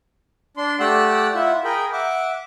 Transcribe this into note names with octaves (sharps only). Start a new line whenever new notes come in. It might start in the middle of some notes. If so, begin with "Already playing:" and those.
D4 C6
A3 G4 D5 F#5 E6 F#6
E4 F4 E5 F#5
G#4 A#4 G5 B5
E5 F#5 D6